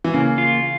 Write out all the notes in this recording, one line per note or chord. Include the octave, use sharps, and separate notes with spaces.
E3
C#3 A#3
F4